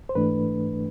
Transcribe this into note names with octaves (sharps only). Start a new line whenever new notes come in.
C5
G#2 E3 A3 D4 B4